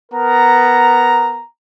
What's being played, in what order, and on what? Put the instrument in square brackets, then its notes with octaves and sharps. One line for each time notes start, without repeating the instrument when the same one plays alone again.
[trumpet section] B3 A#4 A#5